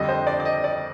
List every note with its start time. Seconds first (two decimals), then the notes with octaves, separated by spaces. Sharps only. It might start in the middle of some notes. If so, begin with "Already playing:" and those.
Already playing: F2 D3 G3 D4 D#5
0.09 C5
0.27 D5
0.40 D5
0.45 D#5
0.64 D5